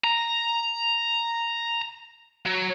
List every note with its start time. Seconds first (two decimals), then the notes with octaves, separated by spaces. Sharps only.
0.04 A#5
2.46 F#3